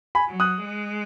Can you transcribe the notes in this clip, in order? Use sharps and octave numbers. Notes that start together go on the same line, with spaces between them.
G#5 B5
F#3
D#6 F#6
G#3